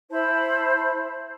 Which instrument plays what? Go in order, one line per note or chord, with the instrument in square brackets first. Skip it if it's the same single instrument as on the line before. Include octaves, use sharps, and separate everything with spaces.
[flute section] E4 C5 A5 B5